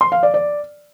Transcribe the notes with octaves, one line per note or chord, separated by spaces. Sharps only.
C6
F5
D5
D5